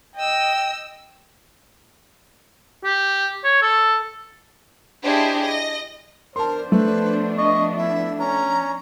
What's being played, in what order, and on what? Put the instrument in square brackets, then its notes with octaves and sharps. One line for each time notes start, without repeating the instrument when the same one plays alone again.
[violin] D#5 E6 [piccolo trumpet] G5
[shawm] G4
C#5
A4
[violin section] D4 E4 G4 G#4 C5 D#5
D#5 A#6
[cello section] F3 B3 D4 [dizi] A#4 [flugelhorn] C5 [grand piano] A5 C6
[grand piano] A3 [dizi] B4
[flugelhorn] D#5 [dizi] C#6
[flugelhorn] E4 [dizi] E5
[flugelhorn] C#4 [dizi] A#5